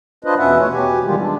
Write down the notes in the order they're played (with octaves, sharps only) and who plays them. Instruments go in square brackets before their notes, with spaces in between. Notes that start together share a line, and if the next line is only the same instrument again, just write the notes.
[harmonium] D4 F4 B4 C5 D#5
E2 B2 C#4 B4 E5 F#5
A3 C#5
B2 G4 G#5
D#3 E3 G3 G#3 F4 G4
G#3 D4